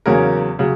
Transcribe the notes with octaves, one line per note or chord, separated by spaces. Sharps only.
E2 C#3 F#3 A#3 C#4 A#4
C#3 F#3